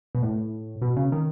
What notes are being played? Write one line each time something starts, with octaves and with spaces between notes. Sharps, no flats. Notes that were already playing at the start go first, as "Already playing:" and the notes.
B2
A2
B2
C#3
D#3